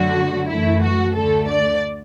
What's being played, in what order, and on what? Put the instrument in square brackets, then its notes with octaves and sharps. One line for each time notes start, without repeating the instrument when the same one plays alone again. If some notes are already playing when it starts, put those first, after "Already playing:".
Already playing: [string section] F#2 D3 F#3 A3 F#4
F#2 E3 A3 E4
F#4
D2 D3 A3 A4
D5